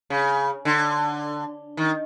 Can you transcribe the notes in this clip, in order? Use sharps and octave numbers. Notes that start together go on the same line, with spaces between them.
C#3
D3
D#3